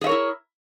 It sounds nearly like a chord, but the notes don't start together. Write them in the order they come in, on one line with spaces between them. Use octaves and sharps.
G#4 E5 C#5 A#4 E4